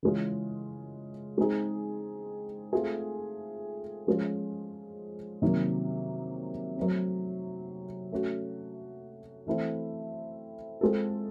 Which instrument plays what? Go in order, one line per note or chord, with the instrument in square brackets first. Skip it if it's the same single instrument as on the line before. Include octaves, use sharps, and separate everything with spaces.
[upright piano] C#3 E3 G#3 C#4 F4
G#3 C4 D#4 G#4
A3 C4 F4 G#4
F3 G#3 C#4 F4 G#4
C3 D#3 F#3 A#3
F#3 A3 C4
A3 C#4 F#4
E3 A3 C4 E4
G#3 C4 F4 A4